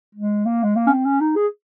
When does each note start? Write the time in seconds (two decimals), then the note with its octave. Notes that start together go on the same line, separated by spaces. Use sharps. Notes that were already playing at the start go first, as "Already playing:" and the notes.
0.15 G#3
0.45 A#3
0.63 G#3
0.76 A#3
0.87 C#4
0.90 C4
1.05 C#4
1.21 D#4
1.36 G#4